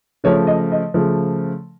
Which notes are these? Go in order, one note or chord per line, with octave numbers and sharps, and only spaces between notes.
C#3 F3 A3 C#5
D#5
D#5
C#3 F3 A3